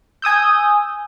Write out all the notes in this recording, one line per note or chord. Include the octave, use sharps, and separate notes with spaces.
G#5 D#6 E6 G6